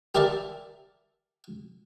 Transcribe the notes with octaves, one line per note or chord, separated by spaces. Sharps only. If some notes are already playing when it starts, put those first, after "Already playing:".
G4 A#4 D5 E5 A5